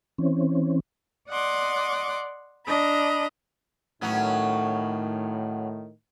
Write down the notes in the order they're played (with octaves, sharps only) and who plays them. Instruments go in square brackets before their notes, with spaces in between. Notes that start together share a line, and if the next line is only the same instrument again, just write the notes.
[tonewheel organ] E3 C4 C#4
[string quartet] D5 D#5 F#5 C6 D6
D4 D#5 A#5 B5
[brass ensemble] A2 D#3 [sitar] F#3 B3 C#4